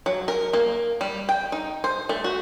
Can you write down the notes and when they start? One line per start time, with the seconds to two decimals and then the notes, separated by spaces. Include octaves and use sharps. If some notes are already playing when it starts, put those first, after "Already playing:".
0.06 F#3
0.28 A#4
0.53 A#3
1.01 G3
1.29 G5
1.52 D#4
1.84 C5
2.09 A3
2.24 F#4